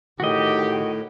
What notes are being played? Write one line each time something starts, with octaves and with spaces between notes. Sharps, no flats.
A2 D#3 F#4 G4 D#5